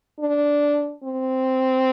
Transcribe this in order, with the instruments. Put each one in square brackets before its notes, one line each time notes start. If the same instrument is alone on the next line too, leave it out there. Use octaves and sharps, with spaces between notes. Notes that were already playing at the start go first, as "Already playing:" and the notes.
[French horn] D4
C4